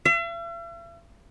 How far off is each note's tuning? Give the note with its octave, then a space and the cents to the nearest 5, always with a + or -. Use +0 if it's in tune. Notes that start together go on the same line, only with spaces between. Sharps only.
E5 +45